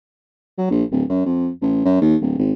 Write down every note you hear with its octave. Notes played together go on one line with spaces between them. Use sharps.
F#3
A#1
D1
F#2
F2
A1
F#2
D#2
D1
G#1